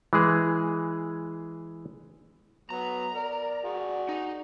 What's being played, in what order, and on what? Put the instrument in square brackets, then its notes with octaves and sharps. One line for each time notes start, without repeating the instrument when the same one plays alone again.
[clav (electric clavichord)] E3 G#3 G#4
[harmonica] F#3 B3 [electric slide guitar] A#5
[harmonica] A#4 [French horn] D5
[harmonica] F#4 G#4
[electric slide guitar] D#4